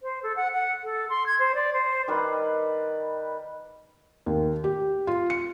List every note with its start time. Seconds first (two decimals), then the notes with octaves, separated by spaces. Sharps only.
0.02 C5
0.23 A4
0.36 F#5
0.53 F#5
0.83 A4
1.09 C6
1.26 G#6
1.39 C5
1.54 D5
1.73 C5
2.08 D#3 G3 B4
4.26 D#2
4.64 G4
5.07 F4
5.30 C#7